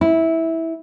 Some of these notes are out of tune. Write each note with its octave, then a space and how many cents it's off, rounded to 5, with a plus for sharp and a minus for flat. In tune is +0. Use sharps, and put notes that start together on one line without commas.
E4 -15